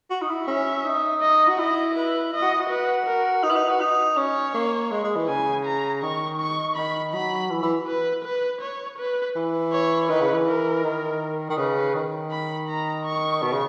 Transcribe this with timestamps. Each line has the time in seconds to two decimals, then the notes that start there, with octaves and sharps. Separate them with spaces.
0.10 F#4
0.22 D#4
0.29 E4
0.47 C#4 E5
0.85 D#4
1.21 D#5
1.48 F#4
1.58 E4 D#5
1.95 B4
2.33 E4 D#5
2.42 F#4
2.60 F#4
2.69 B4
3.06 A#4
3.43 D#4 B4
3.51 E4
3.56 D#4
3.68 F#4
3.80 D#4
4.17 C#4 C#5
4.54 A#3
4.91 G#3
5.04 G#3
5.16 E3
5.28 C#3 G#5
5.65 A#5
6.02 D#3 C#6
6.39 C#6
6.76 D#3 B5
7.13 F#3 B5
7.50 E3
7.63 E3
7.87 B4
8.25 B4
8.61 C#5
8.99 B4
9.35 E3
9.72 C#5
10.09 D#3 B4
10.21 C#3
10.33 E3
10.46 A#4
10.84 D#3
11.50 D#3
11.57 C#3 B4
11.94 D#3
12.31 B5
12.69 A#5
13.05 C#6
13.42 B2
13.53 C#3